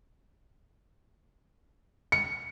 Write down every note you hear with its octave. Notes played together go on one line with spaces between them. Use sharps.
C#7